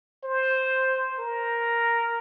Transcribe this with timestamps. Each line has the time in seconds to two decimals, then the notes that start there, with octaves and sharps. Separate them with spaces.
0.24 C5
1.19 A#4